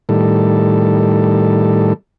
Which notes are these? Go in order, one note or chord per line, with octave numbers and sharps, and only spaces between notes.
A2 D#3 G3 A4